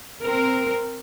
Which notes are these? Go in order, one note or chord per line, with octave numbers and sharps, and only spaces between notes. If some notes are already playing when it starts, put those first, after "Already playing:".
C4 A#4